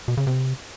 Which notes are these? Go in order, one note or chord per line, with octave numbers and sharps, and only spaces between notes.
B2
C#3
C3